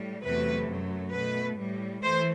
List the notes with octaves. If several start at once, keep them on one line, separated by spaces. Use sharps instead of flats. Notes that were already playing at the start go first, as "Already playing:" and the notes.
Already playing: A2 G3
E2 C3 F#3 A3 B4
F#2 F#3 A3
B2 A3 B4
A2 G3
E3 A3 C5